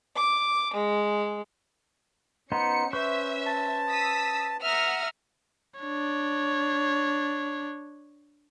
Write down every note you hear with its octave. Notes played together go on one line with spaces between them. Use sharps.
D6
G#3
B3 C#4 D#4 C5 C#7
B4 C5 E5 C#6
A5
D#6 E6 B6
E5 F#5 A#5 D#6 F6
D4 C#5